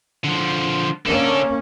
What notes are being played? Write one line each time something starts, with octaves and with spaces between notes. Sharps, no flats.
D3 F3
D3 A#3 C#4 A4